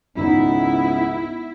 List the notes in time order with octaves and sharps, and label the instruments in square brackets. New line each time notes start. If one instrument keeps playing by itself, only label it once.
[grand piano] G#1 D#4 [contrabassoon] C#2 [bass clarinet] B3 [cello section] E4